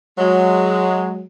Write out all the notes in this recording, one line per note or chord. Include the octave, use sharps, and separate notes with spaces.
F#3 G#3